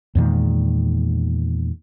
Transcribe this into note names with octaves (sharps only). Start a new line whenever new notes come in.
E2 A#2 D#3 G#3